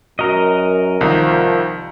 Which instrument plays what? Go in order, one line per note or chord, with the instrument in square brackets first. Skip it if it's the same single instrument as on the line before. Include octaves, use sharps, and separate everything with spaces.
[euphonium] F#2 [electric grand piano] F#4 [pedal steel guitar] A#4 D#5
[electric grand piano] C2 D#3 [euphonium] F3